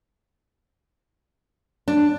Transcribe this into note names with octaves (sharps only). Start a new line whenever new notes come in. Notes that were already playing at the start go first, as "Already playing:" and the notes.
D4